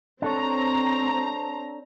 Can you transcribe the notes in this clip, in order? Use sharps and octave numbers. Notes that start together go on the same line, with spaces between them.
C4 D4 A4 C#5 A#5